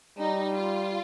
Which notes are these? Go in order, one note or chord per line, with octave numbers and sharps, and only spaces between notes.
G3 D#4
F4